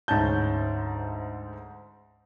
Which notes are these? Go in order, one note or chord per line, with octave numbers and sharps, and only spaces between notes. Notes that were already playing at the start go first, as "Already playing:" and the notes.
D2 G#2 C#4 A5 G6